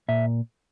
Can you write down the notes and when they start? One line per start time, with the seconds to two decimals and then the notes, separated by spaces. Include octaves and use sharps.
0.08 A#2 E5